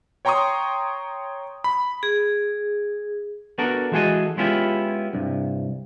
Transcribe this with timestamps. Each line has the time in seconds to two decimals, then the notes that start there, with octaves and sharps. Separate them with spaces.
0.25 C#5 G5 A#5 C6 C#6 D#6
1.64 B5
2.03 G#4
3.58 B3 D4 F#4 A4 A#4
3.92 E3 G#3 F#4 G#4 A4 D#5
4.37 G#3 B3 C#4 E4 F4 G4
5.13 C2 G2